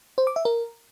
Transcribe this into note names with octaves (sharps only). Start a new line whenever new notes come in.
C5
D6
E5
A#4